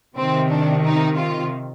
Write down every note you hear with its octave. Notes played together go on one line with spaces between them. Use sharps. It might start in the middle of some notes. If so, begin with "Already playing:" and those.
C3 D#3 C4
D4
D#4
F4